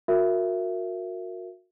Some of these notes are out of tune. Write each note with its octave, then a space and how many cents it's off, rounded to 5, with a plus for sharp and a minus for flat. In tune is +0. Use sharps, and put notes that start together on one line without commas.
F#4 -30 A#4 -15 E5 +20